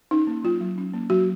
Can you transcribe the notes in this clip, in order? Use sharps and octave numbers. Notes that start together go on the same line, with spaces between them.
C#4 D#4
A#3
F#3 F4
F#3
C#4
A#3
F#3 F#4